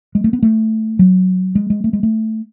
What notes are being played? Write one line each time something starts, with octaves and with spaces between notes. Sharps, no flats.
G#3
A3
B3
A3
F#3
G#3
G#3
A3
G#3
A3